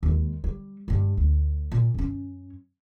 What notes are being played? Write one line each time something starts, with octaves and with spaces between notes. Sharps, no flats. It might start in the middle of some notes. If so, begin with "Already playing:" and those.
D#2 G#3
G3
G2 G#3
D2
A#2
F#2 C#4